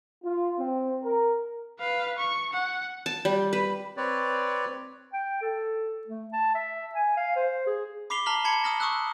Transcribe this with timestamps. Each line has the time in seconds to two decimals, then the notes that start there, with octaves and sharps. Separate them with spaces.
0.24 F4
0.58 C4
1.03 A#4
1.79 B4 F5
2.18 C#6
2.53 F#5
3.06 A5
3.25 G3
3.53 B4
3.97 C4 B4 C#5 D5
5.13 G5
5.42 A4
6.07 A3
6.33 A5
6.55 E5
6.95 G#5
7.17 F5
7.36 C5
7.67 G#4
8.10 B5 D6 B6 C7 F7 G7
8.26 A5 A#5 F6 B6 F#7
8.45 A5 B5 G#6 C#7
8.64 D#6 F6 A#6
8.80 C#6 D#6 E6 F#6